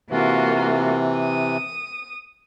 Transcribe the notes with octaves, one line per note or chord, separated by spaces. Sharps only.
C3 E3 A#3 F4 F#4
D#6